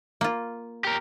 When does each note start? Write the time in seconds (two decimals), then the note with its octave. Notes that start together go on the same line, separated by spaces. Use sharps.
0.21 A#3 F4
0.85 G4 A#4